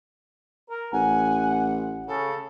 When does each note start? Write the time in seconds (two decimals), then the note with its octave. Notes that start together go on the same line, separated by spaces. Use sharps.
0.70 A#4
0.93 A1 F#5 G#5
2.08 C#3 A4